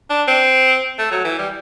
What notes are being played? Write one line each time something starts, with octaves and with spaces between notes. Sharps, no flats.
D4
C4
A3
F#3
E3
G3